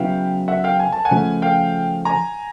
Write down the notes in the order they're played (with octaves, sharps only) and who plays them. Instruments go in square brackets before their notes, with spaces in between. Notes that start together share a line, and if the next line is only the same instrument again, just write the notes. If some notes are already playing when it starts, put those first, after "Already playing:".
Already playing: [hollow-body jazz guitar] C#3 F#3 B3 E4 [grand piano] F5 G5
[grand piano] E5 F#5
F5 G5
G#5
A5
F#5 G#5
[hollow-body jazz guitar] C#3 F3 A3
[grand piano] F5 G5
G#5 A#5